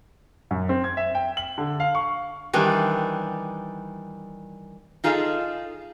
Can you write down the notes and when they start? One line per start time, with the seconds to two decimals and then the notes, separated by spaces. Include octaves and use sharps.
0.51 F#2
0.69 C4
0.84 G#6
0.97 E5
1.15 G5
1.37 F#7
1.58 D3
1.80 F5
1.95 C#6
2.53 D#3 E3 G3 D4
5.04 D#4 F4 G#4 A4 D#5 F5